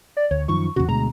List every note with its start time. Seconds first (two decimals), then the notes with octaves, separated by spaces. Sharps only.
0.17 D5
0.31 D2 C#5
0.48 F#2 D#3 F3 C#6
0.76 E2 A#2 C#3 F#4
0.89 D2 B2 G#3 A#5